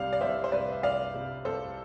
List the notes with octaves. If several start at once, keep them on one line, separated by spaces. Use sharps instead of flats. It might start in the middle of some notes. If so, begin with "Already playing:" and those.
Already playing: C2 C3 G3 D5 F5
D5
C2 C5 E5
C5
C3 G3 B4 D5
E5
C2 D5 F5
C3 G3
C2 A4 C5